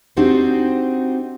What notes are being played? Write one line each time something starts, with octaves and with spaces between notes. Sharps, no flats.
C4 D4 D#4 F#4 G4 C5